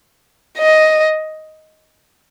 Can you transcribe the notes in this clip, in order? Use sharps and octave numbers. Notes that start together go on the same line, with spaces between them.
D#5